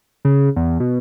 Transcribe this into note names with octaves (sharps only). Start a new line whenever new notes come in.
C#3
E2
B2